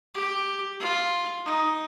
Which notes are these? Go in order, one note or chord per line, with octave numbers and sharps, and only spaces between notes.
G4
F4
D#4